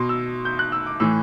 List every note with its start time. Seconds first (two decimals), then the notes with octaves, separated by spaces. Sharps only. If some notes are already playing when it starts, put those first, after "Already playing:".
Already playing: B2 C6
0.09 E6
0.45 G6
0.59 F#6
0.72 E6
0.86 D6
1.00 A2 E3 E6